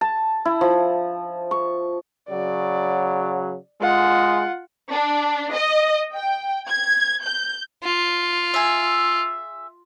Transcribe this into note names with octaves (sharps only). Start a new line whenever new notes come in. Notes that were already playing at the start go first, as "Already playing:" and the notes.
A5
E4
F3
C#6
C#3 F#3 D5
G#3 F4 F#5
D4
D#5
G5
G#6
G6
F4
G#4 E5